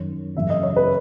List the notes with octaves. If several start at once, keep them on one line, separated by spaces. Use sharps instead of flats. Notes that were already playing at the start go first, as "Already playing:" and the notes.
Already playing: F#2 D#3 C#5
F#2 C#3 E3 E5
D#5
C#5
B4